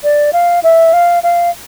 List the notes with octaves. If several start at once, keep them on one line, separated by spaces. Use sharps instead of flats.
D5
F5
E5
F5
F5